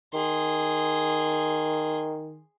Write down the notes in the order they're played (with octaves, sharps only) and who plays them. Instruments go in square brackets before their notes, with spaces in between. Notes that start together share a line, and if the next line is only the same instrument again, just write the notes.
[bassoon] D#3 [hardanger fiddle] G#4 C6